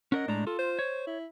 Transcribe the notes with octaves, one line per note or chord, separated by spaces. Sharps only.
C#4 A#4 D#5 F#5
A2 G#3 D4 A#5
F4 A4
C5
C#5
E4